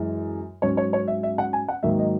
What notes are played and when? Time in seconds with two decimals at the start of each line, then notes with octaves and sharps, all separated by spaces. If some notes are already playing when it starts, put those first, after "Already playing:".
Already playing: F#2 E3 G#3
0.62 G#2 F#3 C#4 C#5
0.77 C#5
0.93 C#5
1.08 E5
1.23 E5
1.38 F#5
1.53 G#5
1.69 F#5
1.83 G#2 D#3 F#3 A#3 E5
1.99 D#5